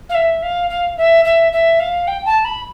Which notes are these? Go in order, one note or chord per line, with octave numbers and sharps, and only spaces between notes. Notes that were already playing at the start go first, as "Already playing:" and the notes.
F5
E5
F5
F5
E5
E5
E5
F5
G5
A5
B5